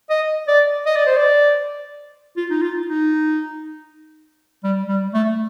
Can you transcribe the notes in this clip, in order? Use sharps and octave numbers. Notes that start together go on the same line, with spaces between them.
D#5
D5
D#5
D5
C5
D5
F4
D#4
F4
D#4
G3
G3
A3